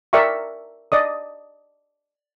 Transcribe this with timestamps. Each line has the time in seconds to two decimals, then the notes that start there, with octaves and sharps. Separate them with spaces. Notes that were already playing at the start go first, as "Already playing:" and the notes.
0.13 A#4 D5 E5 F5 G5 C#6
0.92 D5 D#5 D#6